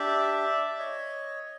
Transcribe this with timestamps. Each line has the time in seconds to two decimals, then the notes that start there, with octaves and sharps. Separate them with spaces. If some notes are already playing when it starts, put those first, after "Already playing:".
Already playing: D4 G4 D5 E5
0.67 D5
0.79 C#5 D#5